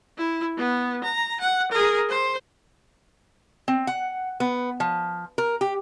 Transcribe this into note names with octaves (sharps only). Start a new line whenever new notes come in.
E4
B3
A#5
F#5
G#4 A#4
C5
C4
F#5
B3
F3
A#4
G4